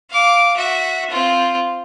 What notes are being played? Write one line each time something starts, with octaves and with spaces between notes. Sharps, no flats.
F5 D6
F#4 E5
C4 F4